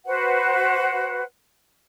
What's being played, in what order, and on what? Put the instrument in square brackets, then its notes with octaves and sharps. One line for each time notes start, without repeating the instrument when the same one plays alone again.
[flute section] F#4 B4 C5 F#5